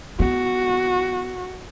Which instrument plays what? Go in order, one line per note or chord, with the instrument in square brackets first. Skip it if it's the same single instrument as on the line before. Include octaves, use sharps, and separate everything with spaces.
[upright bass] B3 [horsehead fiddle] F#4